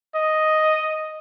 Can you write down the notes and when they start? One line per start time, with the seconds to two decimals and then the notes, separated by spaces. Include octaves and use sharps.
0.15 D#5